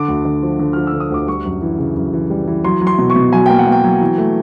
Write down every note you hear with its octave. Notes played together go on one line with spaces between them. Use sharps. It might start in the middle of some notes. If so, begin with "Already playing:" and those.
Already playing: D3 D6
D2
D3
F3
D3
F3 F6
E6
D3
D#6
D2 D6
G3 C#6
F#2
E3
C#3
F#2
E3
G3
E3
F#3 C6
F#3
C6
B2
C#6
B2
F#3 G#5
A#3 G5
F#5
A#3
G5
F#3
E3
A3